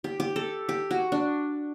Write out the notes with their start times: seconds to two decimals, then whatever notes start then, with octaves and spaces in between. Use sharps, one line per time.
0.04 G4
0.20 G4
0.36 A4
0.69 G4
0.91 F#4
1.12 D4